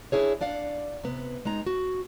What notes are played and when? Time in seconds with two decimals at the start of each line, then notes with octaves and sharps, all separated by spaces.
0.12 D4 E4 G#4 C#5
0.41 D4 D5 F5 F#5
1.03 C3 B3
1.45 G#3 D#4 A#5
1.66 F#4